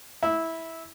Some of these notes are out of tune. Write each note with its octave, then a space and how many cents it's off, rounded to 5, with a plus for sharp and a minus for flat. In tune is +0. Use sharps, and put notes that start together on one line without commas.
E4 -10